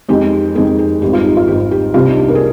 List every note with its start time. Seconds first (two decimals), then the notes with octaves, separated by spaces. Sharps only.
0.09 F2 D#3 G#3 G4
0.55 F2 D#3 G#3 G#4
0.79 G#4
1.02 G#1 G#2 G3 G4
1.13 F4
1.25 D#4
1.37 F4
1.48 G#1 G#2 G3 G4
1.71 G4
1.94 C2 C3 G3 F4
2.06 D#4
2.18 D4
2.29 A#3
2.35 G#4